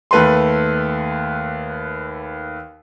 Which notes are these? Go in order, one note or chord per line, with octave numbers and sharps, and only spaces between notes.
D#2 A3 B4 A5 C6